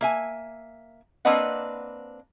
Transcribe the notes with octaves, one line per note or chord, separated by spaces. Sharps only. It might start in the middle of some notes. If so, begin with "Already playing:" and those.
A#3 E5 G#5
A#3 C4 D4 B4 D#5 F#5